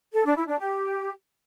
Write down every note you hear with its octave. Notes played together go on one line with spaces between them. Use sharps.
A4
D4
E4
D4
G4